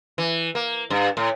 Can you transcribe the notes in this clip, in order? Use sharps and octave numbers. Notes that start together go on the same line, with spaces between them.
E3
A#3
G2
A2